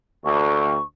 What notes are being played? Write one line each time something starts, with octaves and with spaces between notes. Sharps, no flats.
D2 C#6